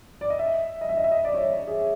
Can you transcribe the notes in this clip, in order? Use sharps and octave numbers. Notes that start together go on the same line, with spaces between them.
D5
D#5
E5
D#5
E5
D#5
E5
D#5
D5
C#5
D5
G#4